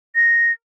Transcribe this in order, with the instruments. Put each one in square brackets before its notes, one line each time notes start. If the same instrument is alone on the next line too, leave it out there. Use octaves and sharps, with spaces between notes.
[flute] A#6